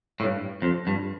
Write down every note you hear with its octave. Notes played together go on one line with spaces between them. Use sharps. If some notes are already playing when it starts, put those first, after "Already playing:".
A2
G2
F2
G2